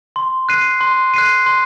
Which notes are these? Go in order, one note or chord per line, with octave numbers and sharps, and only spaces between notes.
C6
F#6 C7 D#7
C6
F#6 C7 D#7
C6